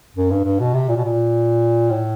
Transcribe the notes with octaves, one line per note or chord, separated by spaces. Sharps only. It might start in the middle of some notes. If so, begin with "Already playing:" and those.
F#2
G2
G2
B2
C3
A#2
B2
A#2
A2